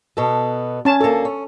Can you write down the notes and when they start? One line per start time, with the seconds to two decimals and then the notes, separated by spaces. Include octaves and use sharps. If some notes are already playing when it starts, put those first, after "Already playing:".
0.17 B2 B3 A4
0.85 C#4 A5
1.01 D2 A#3 A4
1.25 C#4